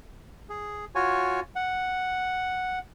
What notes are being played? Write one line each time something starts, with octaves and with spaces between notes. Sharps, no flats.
G#4
F4 F#4 C#5 G#5
F#5